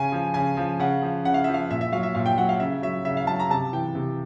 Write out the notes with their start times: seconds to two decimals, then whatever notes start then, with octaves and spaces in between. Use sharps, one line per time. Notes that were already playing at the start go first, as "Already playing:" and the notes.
Already playing: C#3 G#5
0.12 F3
0.34 C#3 G#5
0.57 F3
0.79 C#3 F#5
1.02 F3
1.25 C#3 F#5
1.34 F5
1.44 F3 E5
1.54 F5
1.70 A#2 E5
1.81 E5
1.92 F#3 F5
2.03 E5
2.15 A#2 F5
2.26 G5
2.37 F#3 F#5
2.49 F5
2.60 C#3 E5
2.82 F#3 E5
3.05 C#3 E5
3.17 F5
3.27 F#3 A5
3.39 A#5
3.50 C3 A5
3.72 E3 G5
3.95 C3